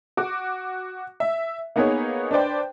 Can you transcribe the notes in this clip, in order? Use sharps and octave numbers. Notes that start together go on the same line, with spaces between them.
F#4 D6
E5
A#3 B3 D#4 G#4 B4 C#5
D4 B4 C5 D5 G5